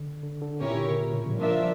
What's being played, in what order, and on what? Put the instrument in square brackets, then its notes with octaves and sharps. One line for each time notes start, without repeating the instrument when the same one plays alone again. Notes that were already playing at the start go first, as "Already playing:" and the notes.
Already playing: [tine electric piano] D3
D3
D3
[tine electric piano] A#2 [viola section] C#4 E4 G4 A#4 C#5
[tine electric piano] D3
C#3
A#2
A2
F3
G3
[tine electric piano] F3 [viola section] A#3 D4 F4 A#4 E5
[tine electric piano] F3